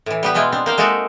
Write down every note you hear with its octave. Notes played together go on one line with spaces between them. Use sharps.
A2 E3
G3 B3 G4
B2 G#3 E4 F4 G5
B3 C4 D4
A#3 C5 F5 G5
G#3 A#3 D#4 F#4 A4 E5